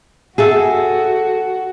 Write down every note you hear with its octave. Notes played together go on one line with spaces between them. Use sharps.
F#4 G#4 A4 E5